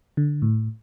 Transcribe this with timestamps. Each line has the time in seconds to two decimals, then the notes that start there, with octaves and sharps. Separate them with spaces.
0.17 D3
0.42 A2